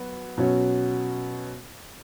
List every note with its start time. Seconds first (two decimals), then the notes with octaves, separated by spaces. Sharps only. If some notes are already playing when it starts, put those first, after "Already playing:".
Already playing: F#3 B3 F#4
0.38 B2 F#3 C#4 F#4